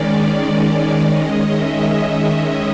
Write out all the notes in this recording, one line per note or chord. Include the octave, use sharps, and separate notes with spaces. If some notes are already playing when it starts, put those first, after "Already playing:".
Already playing: D#3 G#3 C#4 D5
D#3 G#3 C#4 D#5
E5